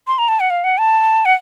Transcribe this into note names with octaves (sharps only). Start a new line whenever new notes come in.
C6
A#5
A5
F#5
F5
F#5
A5
F#5